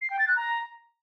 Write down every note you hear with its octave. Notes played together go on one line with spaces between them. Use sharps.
C7
G5
A6
F#6
A#5